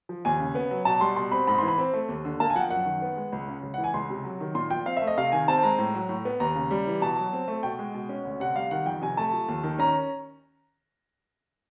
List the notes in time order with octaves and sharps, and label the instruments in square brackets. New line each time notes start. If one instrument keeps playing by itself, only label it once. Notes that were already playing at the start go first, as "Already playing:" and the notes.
[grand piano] F3
D#2 G#5
C#3
B3
F#3
B2 A5
G3 C6
B2 C6
C4 B5
G#2 B5
E3 C6
B5
C4
A3
D#2
D3
A#3 A5
G#5
F3 F#5
G5
F#2 F#5
D#3
B3
G#3
C#2
C#3
C#2
E3 F#5
G#5
C#2 C6
C3
F#3
D#3
A#2 C6
F3 G5
C4 F5
E5
A3
D#5
C3 F5
D#3 G#5
C4 A5
G#3 A#5
A2
F#3
A2
B3
D#2 A#5
C#3
G3
E3
B2 A5
F#3
C4
A3
B2 G5
G#3
B2
C#4
D2
C3 F#5
G3 F5
D#3 F#5
F2 G5
C3 G#5
A3 A5
F3
D#2
D#3
C#4 A#5